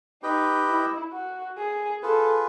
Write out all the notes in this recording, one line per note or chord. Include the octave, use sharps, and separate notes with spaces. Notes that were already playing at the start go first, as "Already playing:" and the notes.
D#4 G4 B4 D#5 G5
E4
F#4
G#4
F4 G#4 A4 B4